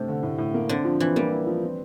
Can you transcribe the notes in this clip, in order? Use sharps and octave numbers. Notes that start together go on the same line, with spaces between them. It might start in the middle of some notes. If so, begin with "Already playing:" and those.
Already playing: G2 C3 A3
D3
A2
A2
A#3
D3 C4
F3
E3 C4
G3 A#3
E4
F3
C4